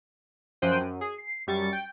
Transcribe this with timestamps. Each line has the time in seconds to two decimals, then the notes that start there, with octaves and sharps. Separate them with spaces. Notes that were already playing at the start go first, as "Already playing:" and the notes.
0.62 F#2 F3 C5 G5 F#6 D#7
0.81 F#2
1.01 G#4
1.18 C7
1.47 F#2 G3 C#6 A6
1.73 G5